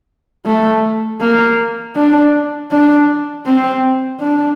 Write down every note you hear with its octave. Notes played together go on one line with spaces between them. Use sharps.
A3
A#3
D4
D4
C4
D4